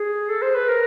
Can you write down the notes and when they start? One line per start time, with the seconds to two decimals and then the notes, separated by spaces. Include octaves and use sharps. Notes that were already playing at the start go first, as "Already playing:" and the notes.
Already playing: G#4
0.29 A4
0.42 C5
0.55 B4
0.69 A#4